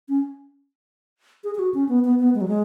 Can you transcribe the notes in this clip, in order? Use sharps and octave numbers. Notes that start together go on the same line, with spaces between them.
C#4
G#4
G#4
F#4
C#4
B3
B3
B3
G#3
F#3
G#3